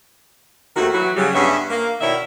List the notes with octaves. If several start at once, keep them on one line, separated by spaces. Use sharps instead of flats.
D#2 D#3 A3 C4 F#4
E3 F#3 F#4
C#3 F#3 G3
G2 B3 C#4 G#4 E5
A#3
B2 D#3 E4 C#5 D5 E5